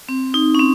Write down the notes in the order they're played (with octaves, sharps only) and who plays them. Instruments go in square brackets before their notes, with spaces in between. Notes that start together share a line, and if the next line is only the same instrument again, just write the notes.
[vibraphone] C4
D#4
C#4
C4